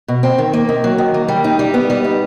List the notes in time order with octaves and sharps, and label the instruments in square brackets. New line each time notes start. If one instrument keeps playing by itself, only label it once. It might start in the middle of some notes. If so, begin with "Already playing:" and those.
[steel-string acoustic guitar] B2
C4
D#3
A#3
D#3
F#3
D#3
A#3
G3
D#4
G3
B3
G3
D#4